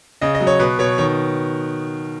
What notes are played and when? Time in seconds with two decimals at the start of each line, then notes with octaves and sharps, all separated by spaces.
0.21 C#3 D#5
0.35 D#5
0.40 F#3
0.47 C#5
0.59 B2 B4
0.79 B2 C#5
0.98 D#3 C#5